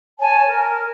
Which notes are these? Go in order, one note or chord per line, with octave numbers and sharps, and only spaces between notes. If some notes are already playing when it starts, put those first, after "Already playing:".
C#5 G#5 A5
A#4